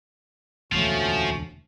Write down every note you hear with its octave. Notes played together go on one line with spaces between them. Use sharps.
E1 D2 A2 F3 A3 C#4 F#4